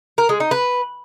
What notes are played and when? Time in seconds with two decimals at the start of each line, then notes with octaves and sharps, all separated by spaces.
0.18 A#4
0.29 G#3
0.40 D#4
0.51 B4